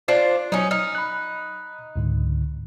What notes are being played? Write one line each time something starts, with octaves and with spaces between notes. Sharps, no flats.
D4 F4 C5
F#3 C#4 D#4
D#4 F6
B5 F#6
C#2 G#2 D3